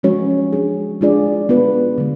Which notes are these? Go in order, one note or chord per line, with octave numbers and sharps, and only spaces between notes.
F3 G#3 C#4 F#4 C#5
G#3 D4 G#4
G#3 D4 F4 G#4 D5
B3 F4 B4
D3 G#3